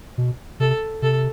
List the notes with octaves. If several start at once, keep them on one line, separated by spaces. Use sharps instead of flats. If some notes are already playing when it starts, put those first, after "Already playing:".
B2
C3 A4
C3 A4